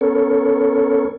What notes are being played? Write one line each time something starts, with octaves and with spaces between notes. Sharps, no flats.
B3 C#4 A4 A#4 C#5